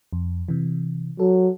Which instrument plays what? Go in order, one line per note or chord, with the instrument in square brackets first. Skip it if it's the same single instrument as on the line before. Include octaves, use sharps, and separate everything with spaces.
[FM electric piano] F2
C3 E3
[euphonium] F#3 [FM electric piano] A4